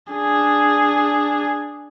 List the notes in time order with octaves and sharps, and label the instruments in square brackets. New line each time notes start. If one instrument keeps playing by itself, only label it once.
[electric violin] D4 G#4